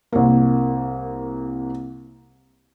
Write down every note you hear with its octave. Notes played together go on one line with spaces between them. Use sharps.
C2 A#3